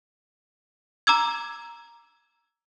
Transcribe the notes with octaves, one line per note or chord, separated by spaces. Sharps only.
A#5 D6 E6 G#6